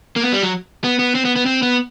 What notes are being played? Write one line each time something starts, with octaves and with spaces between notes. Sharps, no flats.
A#3
B3
G3
F#3
B3
B3
C4
B3
B3
C4
B3